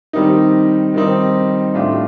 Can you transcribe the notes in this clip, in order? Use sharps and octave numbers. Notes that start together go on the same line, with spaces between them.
D#3 G3 C4 D#4
D#3 G3 C4 D#4
A2 A3 D4 F4